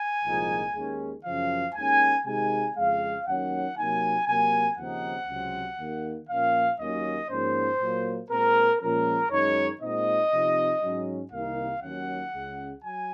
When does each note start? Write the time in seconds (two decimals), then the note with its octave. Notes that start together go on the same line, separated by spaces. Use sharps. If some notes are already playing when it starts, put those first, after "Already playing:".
Already playing: G#5
0.24 C2 A#2 F3 G#3 D#4
0.74 D#2 D#3 G#3 C#4
1.24 F#2 C#3 F3 F5
1.75 D#2 D#3 G#3 C#4 G#5
2.25 C3 D#3 G#3 D#4 G#5
2.76 F2 C#3 G#3 F5
3.26 D#2 D#3 F#3 C#4 F#5
3.76 C3 F#3 A#3 D#4 G#5
4.27 C3 F#3 A#3 G#5
4.77 D#2 C#3 F3 C4 D#4 F#5
5.27 C#2 C3 F#3 C4
5.78 D#2 D#3 A#3
6.28 A#2 F3 A#3 C#4 F5
6.79 D#2 D#3 F#3 A#3 C#4 D#5
7.29 G#2 F3 A#3 C#4 C5
7.79 A#2 F#3 A#3
8.30 A#2 G#3 C4 A#4
8.80 A#2 F3 G#3 C#4 A#4
9.30 F#2 D#3 G#3 D#4 C#5
9.80 A#2 G#3 C4 D#4 D#5
10.31 C3 F3 C4 D#4
10.81 G#2 F#3 C#4
11.31 C2 C3 D#3 A#3 D#4 F5
11.82 D#2 D#3 F#3 C#4 F#5
12.33 C#2 C#3 G#3
12.83 F#3 G#5